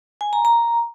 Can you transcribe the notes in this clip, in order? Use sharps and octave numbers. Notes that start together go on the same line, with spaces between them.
G#5
A#5
A#5